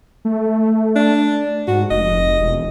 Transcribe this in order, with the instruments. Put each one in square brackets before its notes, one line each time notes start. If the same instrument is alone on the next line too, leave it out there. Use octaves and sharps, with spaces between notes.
[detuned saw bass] A3
[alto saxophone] D4
[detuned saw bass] G#2 [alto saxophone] F#4
[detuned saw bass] F1 [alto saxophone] D#5
[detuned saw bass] E1